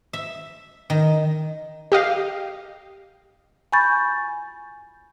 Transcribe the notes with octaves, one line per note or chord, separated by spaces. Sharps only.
E5
D#3
G4 D#5 F5
G#5 B5 C#6 G6 A6